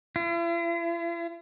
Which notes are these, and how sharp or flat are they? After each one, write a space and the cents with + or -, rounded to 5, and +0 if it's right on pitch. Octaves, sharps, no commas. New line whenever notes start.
E4 +45